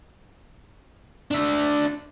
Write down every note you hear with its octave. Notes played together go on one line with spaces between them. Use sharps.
D4 E5